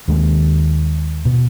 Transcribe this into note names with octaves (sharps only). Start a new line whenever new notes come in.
D#2 D#3 G#3
B2